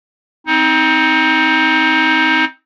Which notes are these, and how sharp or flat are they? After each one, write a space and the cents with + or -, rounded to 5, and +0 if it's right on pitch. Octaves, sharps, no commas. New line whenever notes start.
C4 +0 D#4 +25